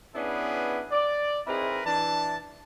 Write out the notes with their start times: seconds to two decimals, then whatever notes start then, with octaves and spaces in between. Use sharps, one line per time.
0.15 B3 C#4 D4 E4 G#4 B4
0.91 D5
1.47 C4 D#4 E4 G#4 A#4 B4
1.85 E3 D4 A5